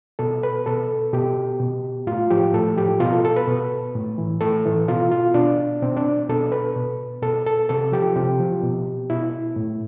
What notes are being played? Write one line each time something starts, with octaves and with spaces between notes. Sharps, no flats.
B2 A4
B4
B2 A4
B2 G4
B2
A2 F4
F3 G4
A2 A4
F3 G4
B2 F4
A4
A4
B4
B2
A2
E3
A2 A4
E3
B2 F4
F4
B2 D4
B2 C4
D4
B2 A4
B4
B2
B2 A4
A4
C3 A4
F3 G4
C3 G4
F3
B2
B2 E4
A2